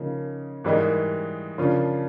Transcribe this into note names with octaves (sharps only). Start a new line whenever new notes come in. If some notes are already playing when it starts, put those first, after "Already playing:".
Already playing: C#3 F3 A#3 D#4
G#2 E3 G3 A#3 D#4
C#3 F3 A#3 D4 F4